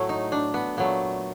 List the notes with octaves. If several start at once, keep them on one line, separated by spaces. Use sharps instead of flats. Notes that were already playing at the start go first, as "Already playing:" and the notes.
Already playing: A2 F#3 A3
D#4
D4
B3
A#2 F#3 A3 B3